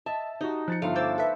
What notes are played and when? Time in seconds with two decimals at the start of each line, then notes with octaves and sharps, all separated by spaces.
0.06 D#5 E5 A5
0.41 D#4 F#4 G4
0.68 F3 F#6 A6 C#7
0.82 G1 A3 F4 F5 C6
0.96 C5 D6 E6 A6
1.18 A4 B4 E5